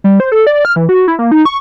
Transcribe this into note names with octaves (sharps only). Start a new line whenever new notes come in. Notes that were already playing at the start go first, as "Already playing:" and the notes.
G3
C5
A4
D5
F6
E3
F#4
E4
A#3
D#4
C#6